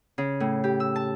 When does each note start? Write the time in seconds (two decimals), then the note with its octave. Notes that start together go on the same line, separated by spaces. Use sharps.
0.18 C#3
0.40 A2
0.64 G4
0.80 E6
0.96 A5